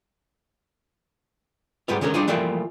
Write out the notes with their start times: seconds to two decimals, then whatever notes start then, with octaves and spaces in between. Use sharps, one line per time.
1.88 G#2 G3 B3 F4
2.01 D3 D#3 G#3 C#4 A#4
2.14 G3 D4 D#4 F4 G#4
2.28 E3 F3 G3 A3 A#3 F4